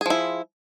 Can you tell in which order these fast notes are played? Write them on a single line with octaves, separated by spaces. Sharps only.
G#4 F3 E4